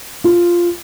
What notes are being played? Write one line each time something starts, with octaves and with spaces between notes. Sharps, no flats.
F4